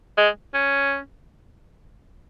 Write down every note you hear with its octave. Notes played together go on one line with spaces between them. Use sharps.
G#3
C#4